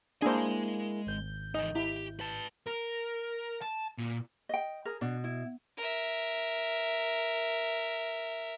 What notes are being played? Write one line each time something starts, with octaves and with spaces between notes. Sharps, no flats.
G#3 A#3 D4 E4 G#4 C5 G#5
G#1 G6
E3 D#4 D#5
E4 G4
B4 A5
A#4
A5
A#2
D#5 G5
G#4 A#4
B2 D4
E4
A#4 E5